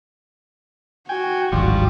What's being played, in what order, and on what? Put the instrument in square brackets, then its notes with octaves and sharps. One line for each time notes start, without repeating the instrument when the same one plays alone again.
[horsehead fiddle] F#4 [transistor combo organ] G5 G#5
[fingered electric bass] D1 G#1 [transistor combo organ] F3 G3